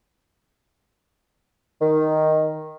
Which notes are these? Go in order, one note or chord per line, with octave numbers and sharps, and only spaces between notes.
D#3